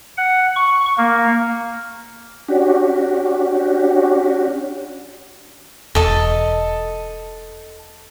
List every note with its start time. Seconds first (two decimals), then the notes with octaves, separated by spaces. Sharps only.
0.18 F#5
0.56 C#6
0.98 A#3
2.48 C#4 D4 F#4 G4
5.95 E1 A4 D#5 A5